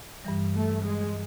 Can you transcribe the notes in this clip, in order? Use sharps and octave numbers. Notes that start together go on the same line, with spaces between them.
G2 E3 G3
A3
G#3